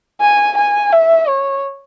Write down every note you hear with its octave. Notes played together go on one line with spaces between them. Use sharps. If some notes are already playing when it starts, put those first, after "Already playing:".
G#5
G#5
E5
C#5